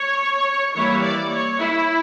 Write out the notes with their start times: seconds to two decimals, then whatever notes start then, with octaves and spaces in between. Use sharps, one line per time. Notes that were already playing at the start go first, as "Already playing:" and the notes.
Already playing: C#5
0.74 E3 G3 A#3 E4 C#5
1.02 D5
1.31 C#5
1.59 E4